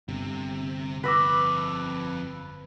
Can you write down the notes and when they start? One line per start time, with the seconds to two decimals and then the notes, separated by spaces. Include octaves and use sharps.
0.08 G1 C3
1.04 F2 B4 B5 D6 E6 A#6 B6